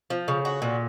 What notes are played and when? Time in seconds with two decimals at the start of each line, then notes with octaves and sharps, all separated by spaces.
0.10 F3
0.28 C#3
0.45 F#4
0.62 A#2